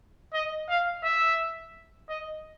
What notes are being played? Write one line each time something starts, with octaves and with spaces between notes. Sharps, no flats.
D#5
F5
E5
D#5